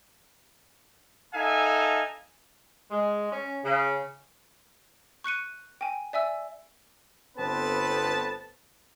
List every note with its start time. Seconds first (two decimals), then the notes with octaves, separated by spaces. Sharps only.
1.34 D#4 A4 E5 F5 G#5
2.90 G#3
3.32 C#4
3.64 C#3
5.24 C#6 F#6 C#7 D#7
5.81 G5 G#5
6.13 D5 E5 G#5 E6
7.37 G1 B3 C4 A4 B4 A5